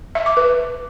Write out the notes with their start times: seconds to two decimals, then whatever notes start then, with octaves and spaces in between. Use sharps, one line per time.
0.15 E5
0.26 D6
0.37 B4